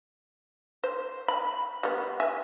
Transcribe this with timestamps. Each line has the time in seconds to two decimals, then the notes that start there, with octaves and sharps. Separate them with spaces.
0.84 C5
1.28 B5
1.83 G3 B3
2.20 E5 G#5